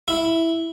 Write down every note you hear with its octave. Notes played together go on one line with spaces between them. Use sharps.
E4